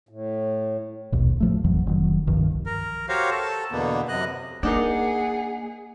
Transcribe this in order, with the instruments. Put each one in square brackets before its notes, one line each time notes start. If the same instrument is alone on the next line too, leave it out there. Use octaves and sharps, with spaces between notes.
[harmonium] A2
[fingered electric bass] A#1 D#2 B2
A2 F3 A3
G#1 F2 E3 F#3
F1 D#3 F#3
C2 G2 D#3 F3
[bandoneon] A#4
F#4 G4 A#4 C5 C#5 F5
A4 A5
E2 B2 D3 A#3 B3
F#2 C3 D#5 F#6
[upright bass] A#3 [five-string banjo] D4 D#4 A#4 [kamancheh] G#4 [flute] F#5